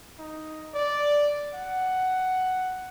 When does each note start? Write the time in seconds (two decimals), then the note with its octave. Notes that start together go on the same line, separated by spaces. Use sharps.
0.19 D#4
0.74 D5
1.55 F#5